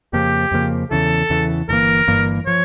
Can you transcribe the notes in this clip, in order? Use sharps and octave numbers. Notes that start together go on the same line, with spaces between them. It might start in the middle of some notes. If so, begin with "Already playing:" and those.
F2 C#3 F3 A#3 G4
F2 C#3 F3 A#3
E2 C#3 E3 A4
E2 C#3 E3
G1 G2 E3 A#3 A#4
G1 G2 E3 A#3
F3 C#5